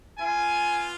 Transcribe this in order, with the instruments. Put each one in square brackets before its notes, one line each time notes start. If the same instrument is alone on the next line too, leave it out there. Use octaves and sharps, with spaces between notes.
[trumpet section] B3 F4 G#5